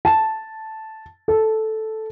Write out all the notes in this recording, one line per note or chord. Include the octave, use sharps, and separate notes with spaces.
A5
A4